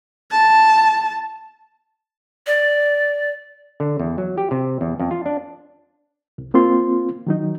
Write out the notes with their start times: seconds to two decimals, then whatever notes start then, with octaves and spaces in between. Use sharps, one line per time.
0.31 A5
2.47 D5
3.80 D3
4.00 E2
4.18 F#3
4.38 G4
4.51 C3
4.81 E2
5.00 F2
5.11 F4
5.26 D4
6.38 C2
6.54 A#3 C4 F4 C6
7.27 D#3 F#3 D#4